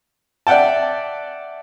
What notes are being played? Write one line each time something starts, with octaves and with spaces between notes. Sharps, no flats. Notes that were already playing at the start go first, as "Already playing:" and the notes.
D5 E5 F#5 G5 A5